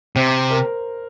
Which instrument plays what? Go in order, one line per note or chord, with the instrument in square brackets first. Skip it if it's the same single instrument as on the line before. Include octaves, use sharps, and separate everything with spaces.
[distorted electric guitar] C3 [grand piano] C5
[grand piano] A#4